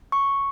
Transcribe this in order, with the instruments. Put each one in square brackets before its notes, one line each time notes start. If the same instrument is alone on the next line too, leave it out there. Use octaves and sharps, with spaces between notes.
[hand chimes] C#6